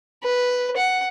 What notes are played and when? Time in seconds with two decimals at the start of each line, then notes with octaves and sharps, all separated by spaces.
0.24 B4
0.76 F#5